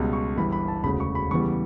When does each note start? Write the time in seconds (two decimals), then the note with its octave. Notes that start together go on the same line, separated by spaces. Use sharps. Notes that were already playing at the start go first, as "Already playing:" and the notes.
Already playing: C#2 B2 G3
0.13 C#6
0.36 G1 G2 E3 G3 B5
0.52 B5
0.68 A5
0.83 E1 D2 C#3 B5
1.00 C#6
1.15 B5
1.31 E2 C#3 E3 G3 C#6